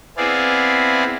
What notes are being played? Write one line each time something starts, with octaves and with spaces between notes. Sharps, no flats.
B3 C4 E4 G#4 D5 F5